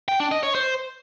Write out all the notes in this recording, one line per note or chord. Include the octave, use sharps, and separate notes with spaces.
G5
D4
D#5
C#5
C5